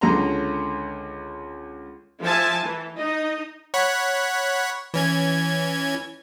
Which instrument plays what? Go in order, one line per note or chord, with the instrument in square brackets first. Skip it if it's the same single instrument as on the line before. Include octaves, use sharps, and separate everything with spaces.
[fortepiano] C#2 D3 C#4 A#5 C6
[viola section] F3 E5 G#5 A5
E3
D#4 D#5
[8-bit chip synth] C#5 F#5 B5
E3 C#4 G#6